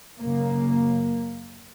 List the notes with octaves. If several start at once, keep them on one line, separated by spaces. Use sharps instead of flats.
F#2 C#3 A#3